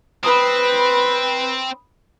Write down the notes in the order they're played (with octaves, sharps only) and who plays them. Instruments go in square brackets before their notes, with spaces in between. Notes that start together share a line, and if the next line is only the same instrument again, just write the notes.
[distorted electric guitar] C4 [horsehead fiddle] B4 [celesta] B5 D#6